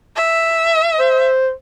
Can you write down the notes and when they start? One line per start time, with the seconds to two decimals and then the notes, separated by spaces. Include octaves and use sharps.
0.16 E5
0.99 C5